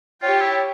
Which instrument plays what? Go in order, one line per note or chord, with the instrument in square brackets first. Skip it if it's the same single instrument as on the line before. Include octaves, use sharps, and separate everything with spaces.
[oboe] F4 [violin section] G4 C#5 G5
[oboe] E4